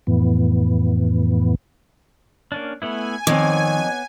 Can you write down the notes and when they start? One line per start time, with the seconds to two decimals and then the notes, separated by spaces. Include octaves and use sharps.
0.07 F2 A2 E3 B3
2.52 A#3 C#4 D4
2.82 A3 B3 E4 G#5
3.27 F2 D#3 B3 C4 C#5 D6